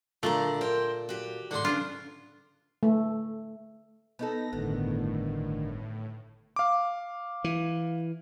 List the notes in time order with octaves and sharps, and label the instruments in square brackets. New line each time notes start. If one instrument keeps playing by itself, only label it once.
[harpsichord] A#2 [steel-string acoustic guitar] D3 D5 A#5 [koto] A3
[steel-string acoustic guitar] A#4 C5 G5
F#4 G4
[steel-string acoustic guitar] A2 A4 [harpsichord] D3 C6
[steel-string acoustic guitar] C#3 E3 D4 [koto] F4
[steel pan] A3
[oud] B3 D#4 A4 [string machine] A#6
[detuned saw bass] G1 [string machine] A2 [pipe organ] D3 D#3 [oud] B3
[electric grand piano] F5 D6
[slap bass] E3